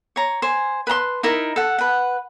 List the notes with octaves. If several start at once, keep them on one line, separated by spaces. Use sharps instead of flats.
C#5 A#5
C5 G#5
B4 A5 A#5 C6
D#4 E4 A#4
A4 F#5
B4 F#5